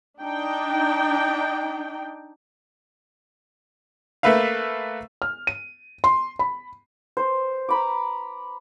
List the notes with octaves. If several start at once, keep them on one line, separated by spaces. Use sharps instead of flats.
D4 D#4 G5
A3 A#3 B4 E5 F5
F6
D#7
C6
B5
C5
A#5 B5 D6